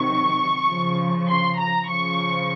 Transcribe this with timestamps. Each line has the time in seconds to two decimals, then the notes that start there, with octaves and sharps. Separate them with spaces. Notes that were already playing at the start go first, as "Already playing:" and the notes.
Already playing: C3 D#3 F#3 C#6
0.68 C#3 F3
1.28 C6
1.58 A#5
1.88 C#3 F3 C#6